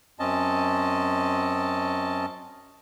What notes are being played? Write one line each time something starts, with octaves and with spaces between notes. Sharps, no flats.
F#2 C4 C#4 D#5 A5